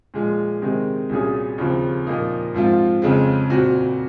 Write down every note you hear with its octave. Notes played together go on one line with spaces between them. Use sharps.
A#2 F3 G#3
C3 D#3 G#3 C4
C2 A#2 F#3 C#4 G#4
D#2 C#3 F3 C4
A#2 F3 A#3 D#4
G#2 F3 C4 F4
F2 C#3 G#3 C4
A#2 F#3 C4 F#4